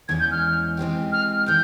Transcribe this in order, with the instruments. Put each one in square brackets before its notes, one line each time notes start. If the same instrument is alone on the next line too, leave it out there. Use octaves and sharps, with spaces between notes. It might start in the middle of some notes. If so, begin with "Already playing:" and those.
[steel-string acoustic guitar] E2 E3 G#3 C#4 [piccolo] G#6
[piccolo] G6
F6
[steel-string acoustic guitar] E3 G#3 C4 G4
[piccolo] F6
F6
[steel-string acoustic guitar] E3 G#3 E4 [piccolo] G6